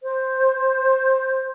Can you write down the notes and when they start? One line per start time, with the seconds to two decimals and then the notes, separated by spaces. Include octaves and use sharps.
0.03 C5